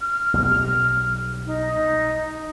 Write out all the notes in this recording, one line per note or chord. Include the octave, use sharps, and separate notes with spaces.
F6
B1 G3
D#4